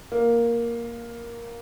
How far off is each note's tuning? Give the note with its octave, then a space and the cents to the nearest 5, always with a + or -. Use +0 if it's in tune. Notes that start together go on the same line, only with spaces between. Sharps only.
A#3 +5